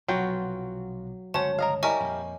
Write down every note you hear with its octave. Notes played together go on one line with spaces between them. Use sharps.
B1 C3 F3 F#3 F4 F#4 B4 G5
G1 C#2 C#4 F#4 C5 C#5 A5
A#4 D#5 F5
G3 E4 A#4 D#5 G#5 C#6
F2 A#2 F3